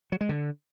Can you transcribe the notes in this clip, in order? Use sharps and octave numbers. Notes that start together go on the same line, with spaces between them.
F#3
G#3
D3